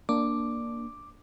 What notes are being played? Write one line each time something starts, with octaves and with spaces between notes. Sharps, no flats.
A#3 D4 D6